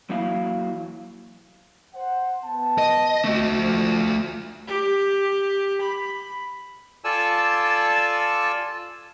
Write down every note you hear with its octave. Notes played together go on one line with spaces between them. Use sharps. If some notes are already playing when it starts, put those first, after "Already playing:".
E2 F#3 A#3 E4 F5
C5 F#5
B3 A5
D#5
A3 F#4
F3
G4
B5
F4 A4 D5 G#5 A5 E6